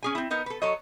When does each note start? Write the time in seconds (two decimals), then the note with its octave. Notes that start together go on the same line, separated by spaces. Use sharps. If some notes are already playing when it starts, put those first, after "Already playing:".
0.03 C#4 G#4 G#5
0.15 C4 E4
0.30 B3 D#4 A#4
0.46 A4 B4
0.62 F#3 A4 C#5 D#5